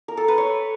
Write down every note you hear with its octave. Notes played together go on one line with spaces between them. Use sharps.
A#4
A4
B4
C#5